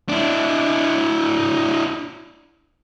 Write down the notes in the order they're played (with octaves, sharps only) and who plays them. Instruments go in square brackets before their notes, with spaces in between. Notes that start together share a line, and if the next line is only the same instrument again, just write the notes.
[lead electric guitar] D4 E4